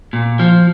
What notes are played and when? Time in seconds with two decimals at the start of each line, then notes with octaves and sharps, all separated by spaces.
0.13 A#2
0.39 F3